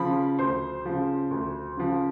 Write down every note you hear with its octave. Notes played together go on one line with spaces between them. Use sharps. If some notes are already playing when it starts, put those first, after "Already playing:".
Already playing: C#3 F3 B5
D2 C5 C6
C#3 F3
D2
C#3 F3